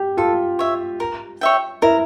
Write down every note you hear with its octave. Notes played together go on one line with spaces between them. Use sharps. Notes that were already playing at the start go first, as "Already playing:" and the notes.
Already playing: G4
F4 A4
C#5 E5
A#4
C#5 E5 G5
E4 A#4